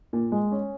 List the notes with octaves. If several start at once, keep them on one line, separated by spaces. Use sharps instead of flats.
A#2
G#3
C#4